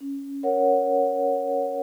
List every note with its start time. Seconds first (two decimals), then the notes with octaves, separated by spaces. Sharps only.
0.01 C#4
0.43 A#4 C#5 F#5